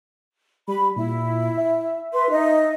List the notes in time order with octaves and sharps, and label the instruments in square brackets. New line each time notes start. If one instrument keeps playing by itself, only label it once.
[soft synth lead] G3 [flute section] B5
[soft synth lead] A#2 [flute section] E4
[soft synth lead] E5
[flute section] B4 C6
D#4 D#5